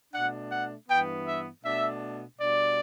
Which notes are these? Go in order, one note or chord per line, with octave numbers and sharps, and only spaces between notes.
B2 A3 D4 F#5
F#5
G2 E3 B3 G5
E5
B2 A3 D4 E5
B2 G3 D4 D5